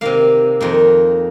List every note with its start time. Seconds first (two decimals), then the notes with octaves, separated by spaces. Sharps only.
0.01 C3 D#3 A#3 F5
0.60 F2 D#3 A#3